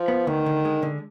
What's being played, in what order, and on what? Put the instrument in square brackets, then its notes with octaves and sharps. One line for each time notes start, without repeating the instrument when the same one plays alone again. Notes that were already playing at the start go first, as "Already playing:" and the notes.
Already playing: [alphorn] F3
[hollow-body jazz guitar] B3
[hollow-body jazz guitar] D2 [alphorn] D#3
[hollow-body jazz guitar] D3
G#3
D3